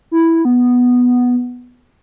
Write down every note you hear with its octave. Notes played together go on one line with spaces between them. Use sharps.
E4
B3